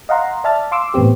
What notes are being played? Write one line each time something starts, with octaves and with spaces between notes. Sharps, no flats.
D#5 F5 F#5 A#5 C6
D5 E5 A5 F6 A6
F5 C6 D6 E6
A2 E3 B3 C4 G4